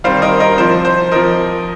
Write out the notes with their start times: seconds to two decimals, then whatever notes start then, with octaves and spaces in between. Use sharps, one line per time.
0.04 C3 D#3 G3 C5 F5
0.22 A#4 D#5
0.40 A#4 D#5
0.58 C3 F3 C5
0.85 C5
1.12 C3 F3 A#4 D#5